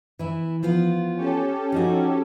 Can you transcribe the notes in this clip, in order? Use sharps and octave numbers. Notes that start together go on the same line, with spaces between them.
E3 E4
F3 B3 F4
C#4 G4 A4
F3 D#4 F#4